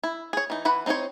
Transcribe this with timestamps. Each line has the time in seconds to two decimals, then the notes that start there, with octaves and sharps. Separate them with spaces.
0.03 E4
0.33 G#4 C#5
0.50 E3 D#4
0.65 E3 B4 F#5 B5
0.86 C4 D#4 E4 C5 C#5